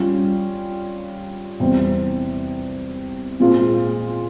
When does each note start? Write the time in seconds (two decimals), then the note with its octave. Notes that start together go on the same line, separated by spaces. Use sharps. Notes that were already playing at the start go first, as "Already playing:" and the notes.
Already playing: G3 C#4 F4
1.60 E2 C3 G3 C4
3.40 A#2 G#3 C4 F4